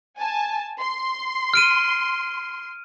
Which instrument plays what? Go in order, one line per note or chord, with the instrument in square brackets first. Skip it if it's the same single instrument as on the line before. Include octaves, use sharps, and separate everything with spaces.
[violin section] G#5 A5
C6
[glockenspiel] F6 D7 D#7